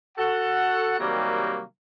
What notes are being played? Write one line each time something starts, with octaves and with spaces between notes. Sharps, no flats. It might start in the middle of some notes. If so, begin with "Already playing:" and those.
F#4 A4 F#5
C3 D#3 F#3 G3 A#3 G4